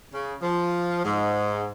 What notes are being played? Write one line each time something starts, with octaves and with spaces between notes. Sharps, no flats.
C#3
F3
G#2